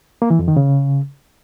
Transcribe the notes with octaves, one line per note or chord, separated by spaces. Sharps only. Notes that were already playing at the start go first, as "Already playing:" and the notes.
A#3
E3
F2
D#3
C#3